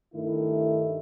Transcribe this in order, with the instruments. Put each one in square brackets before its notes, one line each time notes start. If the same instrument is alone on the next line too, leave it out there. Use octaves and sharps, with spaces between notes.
[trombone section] G2 D#3 A3 E4